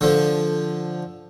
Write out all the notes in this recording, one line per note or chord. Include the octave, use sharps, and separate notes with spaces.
D3 F3